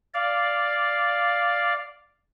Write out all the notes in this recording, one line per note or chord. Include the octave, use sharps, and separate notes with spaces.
D5 F5